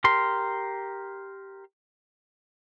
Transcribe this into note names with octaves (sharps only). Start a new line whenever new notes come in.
G4 A#4 C6